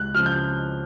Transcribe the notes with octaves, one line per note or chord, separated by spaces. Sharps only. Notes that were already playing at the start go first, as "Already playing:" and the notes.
Already playing: C#2 F#6
C#3 F3 F6
G6